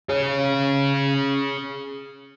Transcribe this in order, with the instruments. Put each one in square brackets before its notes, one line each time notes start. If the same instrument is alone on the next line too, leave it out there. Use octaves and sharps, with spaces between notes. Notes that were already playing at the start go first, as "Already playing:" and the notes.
[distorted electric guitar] G#4 C#5